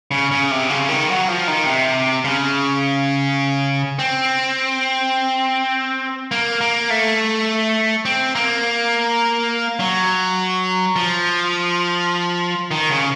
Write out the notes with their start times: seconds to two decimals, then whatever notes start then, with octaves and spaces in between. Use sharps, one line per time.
0.11 C#3
0.31 C#3
0.51 C3
0.70 C#3
0.89 D#3
1.09 F#3
1.28 F3
1.48 D#3
1.66 C3
2.25 C#3
3.99 C4
6.31 A#3
6.61 A#3
6.90 A3
8.05 C4
8.35 A#3
9.80 F#3
10.96 F3
12.71 D#3
12.90 C#3